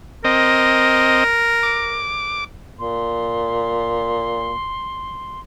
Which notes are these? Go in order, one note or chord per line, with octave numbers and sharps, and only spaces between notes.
C4 A#4 D#5
D6
A#2 C6